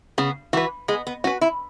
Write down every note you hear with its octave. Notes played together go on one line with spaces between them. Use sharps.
C#3 B3
E3 F#4 B4
G#3 B3
B3
C#4 F#4 B4
E4